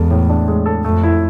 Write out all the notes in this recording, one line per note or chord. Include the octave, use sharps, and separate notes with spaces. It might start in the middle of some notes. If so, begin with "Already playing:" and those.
Already playing: E2 G#3 A4
A2
D4
G#3
A4
F2 A3
E4